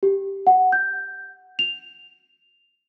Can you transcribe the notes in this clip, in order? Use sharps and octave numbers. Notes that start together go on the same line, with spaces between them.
G4
F#5
G6
F7